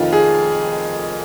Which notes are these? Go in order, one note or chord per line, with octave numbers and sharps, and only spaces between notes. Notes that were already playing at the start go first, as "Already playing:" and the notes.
Already playing: F1 F2 D#3 F4
G#4